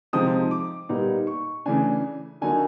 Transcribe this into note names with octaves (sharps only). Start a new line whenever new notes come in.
C3 F3 G#3 C4 D#4 D#6
D6
A#2 G3 B3 D#4
C#6
C#3 E3 A3 D4 G#5
D3 F#3 A#3 D#4 G#5